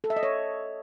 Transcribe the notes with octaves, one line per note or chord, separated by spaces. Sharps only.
A4
E5
D#5
C#5